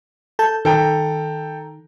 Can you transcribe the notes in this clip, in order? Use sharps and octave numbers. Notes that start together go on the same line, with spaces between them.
A4 A5 G6
D#3 A4 G5 A#5